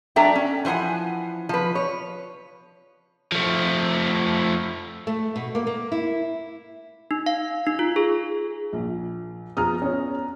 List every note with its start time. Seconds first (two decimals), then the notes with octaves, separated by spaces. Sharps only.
0.16 F#3 D4 A4 E5 G5 A#5
0.36 C#4
0.65 E3 F3 C5 F#5 G#5
1.49 F3 B4
1.75 C#5
3.32 F3 A3
5.07 A3
5.36 B2
5.55 A#3
5.67 A#3
5.92 E4
7.11 D#4
7.26 F5
7.67 D#4
7.79 F4
7.96 G#4
8.73 A#1
9.57 F3 B3 G#4 A#5 D#6 F6
9.82 C#4